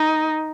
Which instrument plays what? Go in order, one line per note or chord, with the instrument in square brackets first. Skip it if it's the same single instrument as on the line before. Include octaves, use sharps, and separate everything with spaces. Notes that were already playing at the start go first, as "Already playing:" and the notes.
Already playing: [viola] D#4